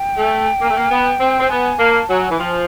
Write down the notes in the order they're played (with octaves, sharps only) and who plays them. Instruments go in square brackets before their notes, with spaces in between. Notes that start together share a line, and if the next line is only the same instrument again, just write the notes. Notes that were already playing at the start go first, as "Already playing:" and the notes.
Already playing: [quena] G5
[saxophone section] A3
A#3
A3
A#3
B3
C4
C4
[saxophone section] B3 [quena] G#5
[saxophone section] A#3 [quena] A5
[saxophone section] F#3 [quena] G#5
[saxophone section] E3
[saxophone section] F3 [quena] G5
[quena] G#5